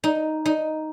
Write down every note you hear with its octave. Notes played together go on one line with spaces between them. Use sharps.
D#4
D#4